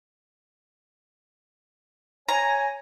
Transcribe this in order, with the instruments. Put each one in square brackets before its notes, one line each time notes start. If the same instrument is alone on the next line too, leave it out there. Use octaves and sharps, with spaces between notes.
[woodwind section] C#5 G#5 [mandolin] A#5